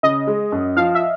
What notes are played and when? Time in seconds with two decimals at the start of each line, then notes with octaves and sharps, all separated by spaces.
0.03 C#3 D#5
0.27 G#3
0.52 F#2
0.76 F3 F5
0.95 E5